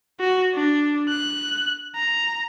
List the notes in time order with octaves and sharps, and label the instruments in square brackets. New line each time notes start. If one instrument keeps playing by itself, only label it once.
[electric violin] F#4
D4
F#6
A#5